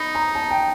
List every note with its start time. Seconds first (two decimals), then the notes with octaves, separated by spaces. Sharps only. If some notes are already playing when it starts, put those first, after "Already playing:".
Already playing: D#4 B5
0.15 A#5
0.35 A5
0.51 G5